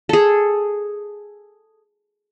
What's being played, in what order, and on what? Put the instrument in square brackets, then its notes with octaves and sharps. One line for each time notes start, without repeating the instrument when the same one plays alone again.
[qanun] G#4 A4